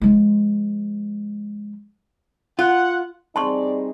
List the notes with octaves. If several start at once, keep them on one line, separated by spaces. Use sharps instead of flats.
F3 G#3
F4 F#5
G3 C4 D#4 G#4 D5 A5 C6 C#6